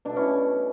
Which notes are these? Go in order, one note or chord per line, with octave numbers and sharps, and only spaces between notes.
B2 A3 D4
C#4 E4